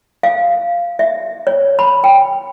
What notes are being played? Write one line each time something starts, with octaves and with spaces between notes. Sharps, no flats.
F5
E5
C#5
B5
G5